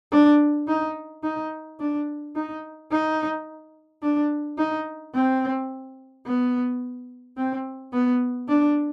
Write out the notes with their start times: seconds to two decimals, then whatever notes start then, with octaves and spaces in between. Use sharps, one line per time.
0.12 D4
0.67 D#4
1.23 D#4
1.80 D4
2.35 D#4
2.91 D#4
4.02 D4
4.58 D#4
5.14 C4
6.26 B3
7.37 C4
7.93 B3
8.49 D4